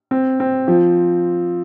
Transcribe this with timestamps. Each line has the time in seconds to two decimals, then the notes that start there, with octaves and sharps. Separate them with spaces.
0.11 C4
0.40 C4
0.68 F3